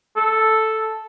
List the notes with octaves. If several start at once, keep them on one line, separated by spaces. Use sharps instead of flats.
A4